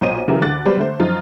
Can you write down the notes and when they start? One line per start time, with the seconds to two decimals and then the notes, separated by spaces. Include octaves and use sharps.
0.01 B1 A#2 C5 C#5 D#5 D#7
0.28 C#3 E3 F#3 E4 G4 A#4
0.41 D2 D3 D6 F#6 A6
0.65 F#3 G3 B3 B4 C5 D5
0.77 D3 A3 C5
1.00 F#2 F3 D#4 F4